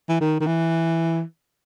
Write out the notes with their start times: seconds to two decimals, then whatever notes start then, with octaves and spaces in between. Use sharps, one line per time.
0.09 E3
0.21 D#3
0.40 D#3
0.47 E3